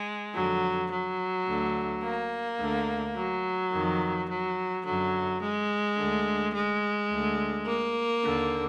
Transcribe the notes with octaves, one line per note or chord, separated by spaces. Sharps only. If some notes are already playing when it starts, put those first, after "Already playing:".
Already playing: G#3
F2 D3 F#3
F#3
D2 D3
A#3
D2 D3
F#3
F2 D#3
F#3
F#2 D3 F#3
G#3
D2 D3
G#3
D2 D3
A#3
D#2 D3